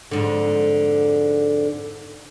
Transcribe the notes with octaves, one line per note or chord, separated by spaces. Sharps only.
F2 G#2 D3